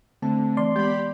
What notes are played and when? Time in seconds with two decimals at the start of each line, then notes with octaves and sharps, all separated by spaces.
0.22 D3 A3 C4 A5
0.57 E3 D5 C6
0.76 G#3 B3 G4 B5 G6